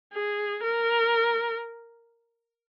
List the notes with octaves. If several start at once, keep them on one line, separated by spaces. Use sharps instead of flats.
G#4
A#4